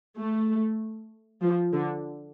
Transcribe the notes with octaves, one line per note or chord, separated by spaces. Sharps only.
A3
F3
D3